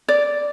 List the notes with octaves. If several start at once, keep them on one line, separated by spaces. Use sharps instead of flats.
D5